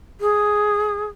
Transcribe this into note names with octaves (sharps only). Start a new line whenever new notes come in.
G#4